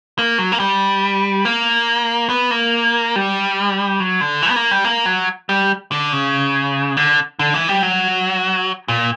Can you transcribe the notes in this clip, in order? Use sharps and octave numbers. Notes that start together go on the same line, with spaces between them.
A#3
F#3
A#3
G3
A#3
B3
A#3
G3
F#3
D3
E3
B3
A#3
G3
A#3
F#3
G3
D3
C#3
D3
D3
E3
G3
F#3
A#2